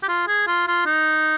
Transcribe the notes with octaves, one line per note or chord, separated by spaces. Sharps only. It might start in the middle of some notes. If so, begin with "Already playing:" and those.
G4
F4
G#4
F4
F4
D#4